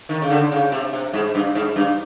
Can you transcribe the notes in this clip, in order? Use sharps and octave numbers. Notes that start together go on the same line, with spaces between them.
D#3
C#3
D3
C#3
C3
C3
G#2
G2
G#2
G2